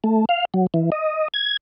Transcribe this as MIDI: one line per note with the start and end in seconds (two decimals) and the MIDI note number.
0.04 0.25 57
0.29 0.45 77
0.54 0.67 54
0.74 0.90 52
0.92 1.28 75
1.34 1.57 92